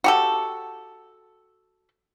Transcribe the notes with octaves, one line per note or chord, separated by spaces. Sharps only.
F#4 G4 A4